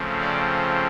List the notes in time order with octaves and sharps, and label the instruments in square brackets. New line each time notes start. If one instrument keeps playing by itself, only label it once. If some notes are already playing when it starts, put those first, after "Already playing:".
Already playing: [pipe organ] C#3 F3 A3 C4
D5